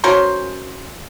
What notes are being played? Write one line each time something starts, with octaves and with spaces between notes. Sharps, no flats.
C#4 F#4 A#4 C5